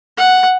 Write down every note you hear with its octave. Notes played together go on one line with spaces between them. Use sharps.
F#5